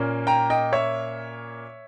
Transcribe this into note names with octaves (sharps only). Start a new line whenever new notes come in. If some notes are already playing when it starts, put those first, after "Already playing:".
Already playing: A#2 A#3 C#4
G5 A#5
D#5 G5
C#5 E5